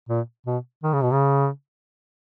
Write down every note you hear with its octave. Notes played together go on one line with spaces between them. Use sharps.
A#2
B2
D#3
C#3
B2
C#3